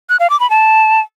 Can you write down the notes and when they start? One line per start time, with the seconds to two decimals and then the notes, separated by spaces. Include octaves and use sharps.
0.09 F#6
0.20 F5
0.30 D6
0.40 B5
0.50 A5